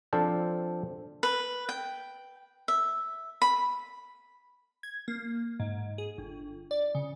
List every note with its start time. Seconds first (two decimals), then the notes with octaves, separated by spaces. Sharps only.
0.13 F3 C4 D4 F4 A4 C5
1.23 B4
1.69 G5
2.68 E5
3.42 B5
4.83 G#6
5.08 A#3
5.60 G#2
5.98 G#4
6.18 G1
6.71 D5
6.95 C#3